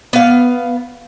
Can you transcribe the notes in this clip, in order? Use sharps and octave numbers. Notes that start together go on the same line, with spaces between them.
B3 F5